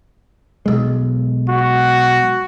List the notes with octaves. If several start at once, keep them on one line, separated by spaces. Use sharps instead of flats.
B1 G#3
F#4